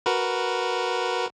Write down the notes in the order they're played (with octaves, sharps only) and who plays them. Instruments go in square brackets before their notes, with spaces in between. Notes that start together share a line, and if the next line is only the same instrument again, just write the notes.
[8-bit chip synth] F#4 A#4 B4